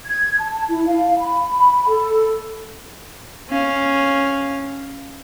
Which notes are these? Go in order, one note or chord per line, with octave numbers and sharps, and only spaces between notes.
G#6
A5
E4
F5
B5
B5
A4
C#4 F5